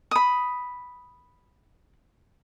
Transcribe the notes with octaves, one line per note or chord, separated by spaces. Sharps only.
B5 D#6